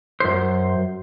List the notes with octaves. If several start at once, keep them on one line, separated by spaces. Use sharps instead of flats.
F#2 C5